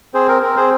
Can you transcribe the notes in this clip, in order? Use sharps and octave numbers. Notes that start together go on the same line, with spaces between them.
C4 G#4 C5
A#4
C4 A#4
G#4 C5